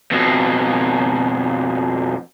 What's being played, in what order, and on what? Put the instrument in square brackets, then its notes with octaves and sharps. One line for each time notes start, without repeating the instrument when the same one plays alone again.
[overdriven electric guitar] F2 B2